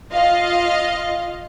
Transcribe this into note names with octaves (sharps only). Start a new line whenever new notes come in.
F4 D#5 F5